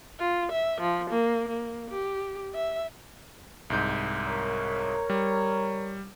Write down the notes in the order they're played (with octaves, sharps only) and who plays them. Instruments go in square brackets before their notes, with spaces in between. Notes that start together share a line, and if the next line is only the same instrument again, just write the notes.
[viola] F4
E5
F3
A#3
A#3
G4
E5
[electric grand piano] C2 G#2 G6
[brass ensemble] A#4 C#5
[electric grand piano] G3